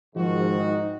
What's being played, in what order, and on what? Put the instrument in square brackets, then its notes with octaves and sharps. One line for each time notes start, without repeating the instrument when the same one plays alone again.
[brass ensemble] G#2 D#3 F#4 [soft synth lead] F3
[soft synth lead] D#4